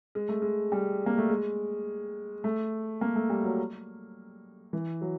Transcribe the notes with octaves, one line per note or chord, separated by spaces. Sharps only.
G#3
A3
G#3
G3
A#3
A3
G#3
A3
A#3
A3
G3
F#3
E3
F#3